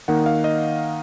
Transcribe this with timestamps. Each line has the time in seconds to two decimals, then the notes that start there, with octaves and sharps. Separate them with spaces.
0.08 D#3 A#3 D#4 F#5
0.26 F5
0.44 D#5